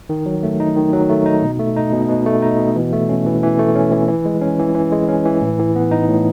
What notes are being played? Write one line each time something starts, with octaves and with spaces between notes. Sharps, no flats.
D#3
F#3
A3
D#4
D#3
F#3
A3
D#4
B2
A3
D#4
B2
B2
A3
D#4
B2
E3
A3
C#4
E3
E3
A3
C#4
E3
E3
G#3
C#4
E3
E3
G#3
C#4
E3
A2
E3
B3
D#4
A2